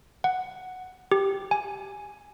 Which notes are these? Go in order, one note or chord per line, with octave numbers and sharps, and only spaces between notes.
F#5
G4
G#5